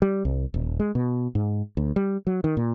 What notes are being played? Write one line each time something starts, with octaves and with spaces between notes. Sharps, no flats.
G3
C2
D#1
G#3
B2
G#2
D2
G3
F#3
D#3
A#2